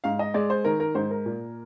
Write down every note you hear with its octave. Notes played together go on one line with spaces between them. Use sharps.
G#2 F5
D#5
G#3 D5
C5
D#3 A#4
A#4
G#2 C5
A#4
A#2